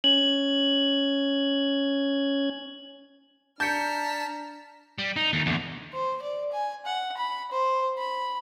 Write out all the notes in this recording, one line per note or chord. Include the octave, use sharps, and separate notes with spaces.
C#4 G#6 F#7
D4 A5 A#5 F6 G6 B6 C#7
G3
D#4
D#2 A3
E2 D3
C5
D5
G#5
F#5
B5
C5
B5